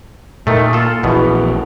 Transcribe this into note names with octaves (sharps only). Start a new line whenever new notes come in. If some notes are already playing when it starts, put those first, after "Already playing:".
A#2 D#3 A3 A#3
F4 A4
A#1 E2 B2 E3 B3